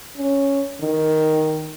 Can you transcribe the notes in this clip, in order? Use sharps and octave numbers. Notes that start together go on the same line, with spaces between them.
C#4
D#3